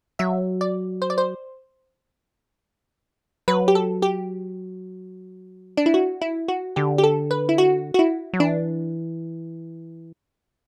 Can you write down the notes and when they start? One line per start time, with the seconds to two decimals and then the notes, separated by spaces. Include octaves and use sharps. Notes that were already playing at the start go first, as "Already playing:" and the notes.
0.19 F#3 E5
0.61 D5
1.02 C5
1.10 D5
1.18 C5
3.48 F#3 B4
3.68 G4
3.75 A4
4.02 G4
5.77 D4
5.86 E4
5.94 F#4
6.22 E4
6.48 F#4
6.76 D3 G4
6.98 G4
7.04 A4
7.31 B4
7.49 E4
7.58 F#4
7.94 F#4
7.99 E4
8.33 F#3
8.40 E3 D4